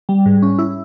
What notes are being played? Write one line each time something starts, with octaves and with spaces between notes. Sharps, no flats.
G3
G#2
C#4
E4